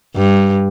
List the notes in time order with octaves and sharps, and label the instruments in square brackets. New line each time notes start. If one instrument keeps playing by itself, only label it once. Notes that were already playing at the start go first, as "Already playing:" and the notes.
[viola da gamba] G2